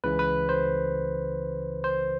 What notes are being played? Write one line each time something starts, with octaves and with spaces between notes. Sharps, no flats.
C#2 C#3 E3 B4
B4
C5
C5